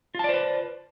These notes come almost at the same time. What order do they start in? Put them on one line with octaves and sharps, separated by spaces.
F4 A5 D5 C5 B4